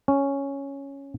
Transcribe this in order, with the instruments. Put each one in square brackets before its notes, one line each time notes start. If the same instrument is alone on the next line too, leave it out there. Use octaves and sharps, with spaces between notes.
[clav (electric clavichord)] C#4